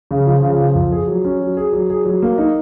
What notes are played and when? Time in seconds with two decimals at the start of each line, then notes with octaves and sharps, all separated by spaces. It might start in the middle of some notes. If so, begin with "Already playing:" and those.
0.11 C#3
0.26 F3
0.43 C#3
0.59 F3
0.75 F2
0.92 G#4
1.07 F#3
1.25 C#4
1.41 F#3
1.57 G#4
1.73 F#3
1.90 G#4
2.05 F#3
2.22 A#3
2.38 D#4